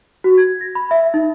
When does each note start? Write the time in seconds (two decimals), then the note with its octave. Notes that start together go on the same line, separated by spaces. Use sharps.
0.24 F#4
0.38 G#6
0.61 A#6
0.75 B5
0.91 E5
1.14 D#4